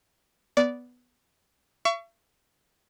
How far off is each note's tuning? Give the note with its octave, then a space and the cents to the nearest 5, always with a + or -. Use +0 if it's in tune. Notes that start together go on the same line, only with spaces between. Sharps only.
B3 +0 D5 -15
E5 +45 C#6 +20